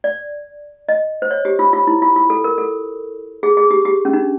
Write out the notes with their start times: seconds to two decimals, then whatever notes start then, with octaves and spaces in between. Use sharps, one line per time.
0.04 D5
0.89 D#5
1.22 C5
1.31 C#5
1.45 G4
1.59 F4
1.73 F4
1.87 E4
2.02 F4
2.16 F4
2.30 A4
2.44 A#4
2.58 A4
3.43 G#4
3.57 G#4
3.71 G4
3.85 G4
4.05 C#4
4.13 D4